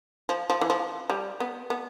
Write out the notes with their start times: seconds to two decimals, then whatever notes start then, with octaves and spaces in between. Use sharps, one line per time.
0.29 F3
0.50 F3
0.61 E3
0.70 F3
1.10 G3
1.40 B3
1.70 B3